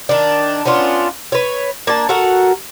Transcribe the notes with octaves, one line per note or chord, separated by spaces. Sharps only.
D#3 D4
B3 C#4 D4 F4
B4 C#5
A#3 D4 A5
F#4 A4 A#4 F#5